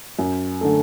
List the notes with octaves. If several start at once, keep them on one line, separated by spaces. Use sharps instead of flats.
F#2
D3 A3